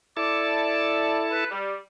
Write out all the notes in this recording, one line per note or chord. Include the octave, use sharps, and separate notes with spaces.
E4 A4 D5 A5
B4
G3